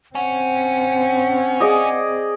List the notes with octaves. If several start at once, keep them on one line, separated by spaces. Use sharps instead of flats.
C4 C#4 F#5
G#4 D5 D#5